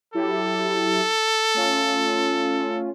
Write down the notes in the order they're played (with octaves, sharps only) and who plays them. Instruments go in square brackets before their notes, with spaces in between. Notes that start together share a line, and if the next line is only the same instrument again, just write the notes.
[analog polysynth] F#3 E4 G4 [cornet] A4
[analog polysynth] A3 C#4 F4